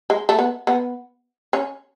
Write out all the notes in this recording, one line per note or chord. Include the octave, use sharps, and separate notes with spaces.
G#3
A3
B3
B3
C#4